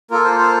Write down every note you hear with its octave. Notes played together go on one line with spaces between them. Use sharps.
A#3 F4 A4 A#4
C5
C5